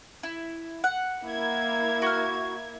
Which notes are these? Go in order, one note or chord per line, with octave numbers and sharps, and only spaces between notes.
E4
F#5
A#3 E4 G#6
F#4 F6